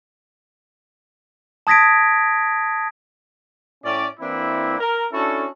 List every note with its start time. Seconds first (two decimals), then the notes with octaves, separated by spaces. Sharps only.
1.67 A5 D#6 G#6 A#6 B6 D7
3.84 A2 C#4 D5
4.20 E3 A#3 C4 D4 E4
4.79 A#4
5.11 C#4 D4 E4 F#4 A4